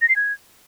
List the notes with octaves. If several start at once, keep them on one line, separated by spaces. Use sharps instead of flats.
A#6
C7
G#6